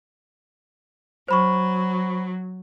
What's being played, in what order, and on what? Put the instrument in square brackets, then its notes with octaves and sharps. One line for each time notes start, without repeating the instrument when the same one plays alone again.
[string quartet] F#3 [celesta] C5 B5 C#6